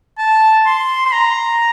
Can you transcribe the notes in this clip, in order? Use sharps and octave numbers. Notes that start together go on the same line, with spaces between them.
A5
C6
C6
A#5